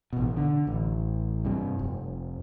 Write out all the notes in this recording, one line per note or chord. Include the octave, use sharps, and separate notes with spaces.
A1 B2
D3
A1
G2 C3
F1